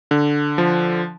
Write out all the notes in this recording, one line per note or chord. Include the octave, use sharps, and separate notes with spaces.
D3
F3